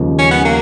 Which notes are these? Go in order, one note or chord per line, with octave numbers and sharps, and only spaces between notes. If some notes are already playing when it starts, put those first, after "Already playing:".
Already playing: D#2 C#3 F3 G#3
C#4
B3
A#3